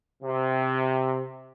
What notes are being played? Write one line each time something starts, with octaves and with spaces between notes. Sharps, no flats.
C3